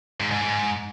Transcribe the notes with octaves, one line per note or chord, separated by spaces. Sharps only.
G#2
G#2
G#2